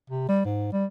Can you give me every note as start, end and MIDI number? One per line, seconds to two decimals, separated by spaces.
0.10 0.25 48
0.29 0.42 55
0.45 0.70 44
0.73 0.85 55